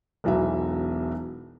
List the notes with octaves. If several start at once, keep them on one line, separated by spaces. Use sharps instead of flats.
E1 B1 E3 F#3 E5